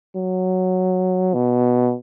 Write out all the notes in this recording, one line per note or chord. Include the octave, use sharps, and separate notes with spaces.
F#3
B2